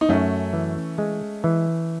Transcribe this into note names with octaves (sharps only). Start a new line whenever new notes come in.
D#4
F#2 A3 C#4
E3
G#3
E3